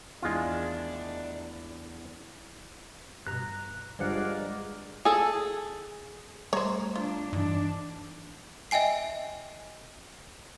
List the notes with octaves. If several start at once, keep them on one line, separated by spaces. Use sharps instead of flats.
E2 D#3 G#3 A3 D4 F4
G2 B2 A#5 F#6
G1 G2 F3 G#3 A#4 D5 F5 F#5
G#4 A4
G3 A3 C5 C#5 A#5
D4 F4
G2 E3 D4 D#4
D#5 E5 G5 G#5 C7